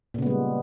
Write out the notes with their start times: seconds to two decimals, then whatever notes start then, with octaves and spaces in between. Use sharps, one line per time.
0.14 A#2
0.18 C#3
0.22 B3
0.26 G#3
0.30 G3